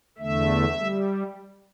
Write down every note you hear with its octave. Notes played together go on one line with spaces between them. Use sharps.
E2 D3 A3 E5
G3